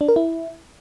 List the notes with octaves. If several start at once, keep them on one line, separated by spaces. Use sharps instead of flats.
D4
A#4
E4